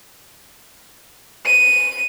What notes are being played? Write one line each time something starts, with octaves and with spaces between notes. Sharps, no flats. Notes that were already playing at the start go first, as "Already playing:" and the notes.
D#7